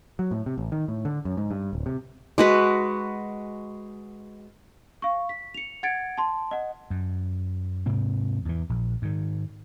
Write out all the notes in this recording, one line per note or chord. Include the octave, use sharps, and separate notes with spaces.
F#3
A2
C3
A1
D#3
A2
D3
F#2
G#2
G2
D1
C3
G#3 F#4 B4
F5 C#6
B6
C#7 F7
F#5 G#6 A6 C#7 D7
A5 C6
D#5 F#5
F#2
G#2 C3 C4
E2 E3
A#1
G#2 D#3